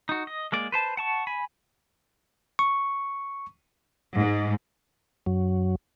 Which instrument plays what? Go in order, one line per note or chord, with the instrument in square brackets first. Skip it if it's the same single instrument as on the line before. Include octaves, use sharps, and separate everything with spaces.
[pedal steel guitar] D#4 F#4
D#5
G#3 A#3 D5
B4 C5 A5
F#5 A5 C#6
G#5 B5
[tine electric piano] C#6
[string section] G#2
[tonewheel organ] F#2 F#3